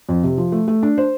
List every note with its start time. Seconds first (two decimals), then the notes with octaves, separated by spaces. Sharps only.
0.09 F2
0.23 C3
0.38 F3
0.52 A3
0.68 A3
0.83 D4
0.98 C5